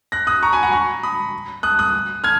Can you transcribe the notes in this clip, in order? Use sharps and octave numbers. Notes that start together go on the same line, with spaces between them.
F#6 A#6
D#6 F#6
A#5 C#6
G#5 B5
F#5 A#5
A#5 C#6
B5 D#6
D#6 F#6
D#6 F#6
F6 G#6